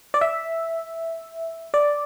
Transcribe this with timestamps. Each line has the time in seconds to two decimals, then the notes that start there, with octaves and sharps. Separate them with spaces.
0.14 D5
0.21 E5
1.74 D5